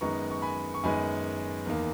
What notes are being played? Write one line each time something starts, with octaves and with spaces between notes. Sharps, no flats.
F#2 D#3 G#3 B3 A#5 C#6
C#6
G#5 B5
C#6
F#2 D#3 G#3 B3 G#5 B5
E2 D#3 A#3